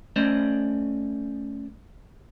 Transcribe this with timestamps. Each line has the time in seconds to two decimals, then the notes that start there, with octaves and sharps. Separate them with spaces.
0.16 A3 C#4 C5 D5 D#5